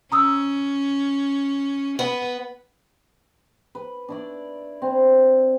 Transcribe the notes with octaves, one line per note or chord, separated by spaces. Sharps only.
C#4 A#5 D#6 E6
B3 B4
B4
D4 E4 D5
C4